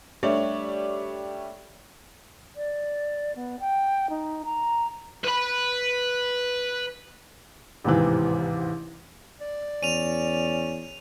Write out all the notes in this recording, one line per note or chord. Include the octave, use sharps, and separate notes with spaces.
G3 A3 D4 G4 C#5 D5
D5
B3
G5
D#4
A#5
B4 B5
A1 D#2 G#2 C3 E3
D5
E2 C#4 D#7 F7